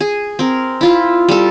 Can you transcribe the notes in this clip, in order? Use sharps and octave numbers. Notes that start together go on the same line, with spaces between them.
G#4
C4 A#4
E4 F4
G3 A4